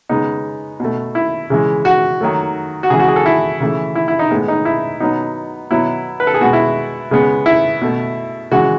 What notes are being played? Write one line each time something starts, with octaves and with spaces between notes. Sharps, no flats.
C#3 G#3 B3 D#4
B2 A3
E4
C#3 E3 G#3
F#4
D#3 F#3 A3
F#4
C#3 E3 G#3 G#4
F#4
G#4
A4
E4
C#3 E3 A3
E4
E4
D#4
A2 G#3 B3
D#4
E4
B2 F#3 B3 D#4
B2 F#3 B3 E4
B4
A4
G#4
B2 G#3 B3 F#4
E4
C#3 G#3 B3
E4
B2 A3
C#3 E3 G#3 F#4